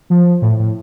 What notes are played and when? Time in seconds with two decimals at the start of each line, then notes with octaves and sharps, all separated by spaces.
0.10 F3
0.42 A2
0.59 A2